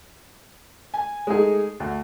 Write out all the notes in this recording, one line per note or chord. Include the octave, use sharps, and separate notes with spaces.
G#5
G#3 A3 D#4 G#4
D2